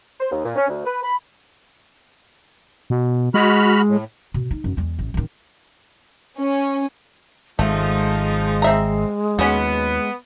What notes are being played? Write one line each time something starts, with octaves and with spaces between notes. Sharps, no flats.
C5
D#2
A#2
C#4
D2
B4
B5
B2
G#3 F#4 B5 F6
A2
B2
D#4
F#2
E2 G#3
A1
A1 D#3
C#4
G#1 F3 G#3 A3 D#4
C4 E5 A#5
D#2 B3 C#4 F#4